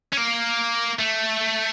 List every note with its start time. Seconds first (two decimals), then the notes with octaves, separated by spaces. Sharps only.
0.12 C#4
0.17 A#3
0.99 A3